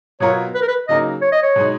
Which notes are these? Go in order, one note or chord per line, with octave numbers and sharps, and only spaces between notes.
B2 F#3 B3 F4 A#4 C#5
B4
A#4
B4
C#3 F#3 A#3 D#4 A#4 D#5
C#5
D#5
C#5
B2 G#3 D#4